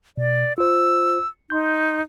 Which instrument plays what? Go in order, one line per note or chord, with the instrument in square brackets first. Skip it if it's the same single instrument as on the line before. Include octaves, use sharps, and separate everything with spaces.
[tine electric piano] B2 [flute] D5
[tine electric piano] F4 C5 [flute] E6
[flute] D#4 [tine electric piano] C6 G6